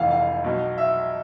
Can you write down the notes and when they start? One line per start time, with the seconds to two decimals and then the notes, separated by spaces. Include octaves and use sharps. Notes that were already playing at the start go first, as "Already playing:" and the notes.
Already playing: F1 F2 E3 F5
0.11 F5
0.44 B1 B2
0.78 E5